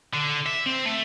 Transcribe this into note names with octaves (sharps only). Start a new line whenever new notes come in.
D3
E5
C4
A3